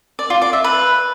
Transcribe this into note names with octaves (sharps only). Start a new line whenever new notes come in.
D5
F4
D5
E5
B4